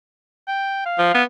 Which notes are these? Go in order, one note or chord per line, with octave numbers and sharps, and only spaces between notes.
G5
F5
F3
B3